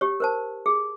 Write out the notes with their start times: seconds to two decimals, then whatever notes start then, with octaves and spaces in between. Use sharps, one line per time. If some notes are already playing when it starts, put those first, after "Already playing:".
0.01 G4 C#5
0.20 A#4 C5 A5
0.66 G#4